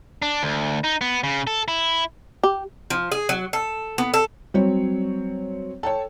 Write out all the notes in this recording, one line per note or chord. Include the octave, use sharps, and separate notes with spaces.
D4
D2
D#4
B3
C#3
A4
E4
G4
F3
G#4
F#3
A4
B3
A4
F#3 G3 C4 C#5
A4 C#5 G5 A5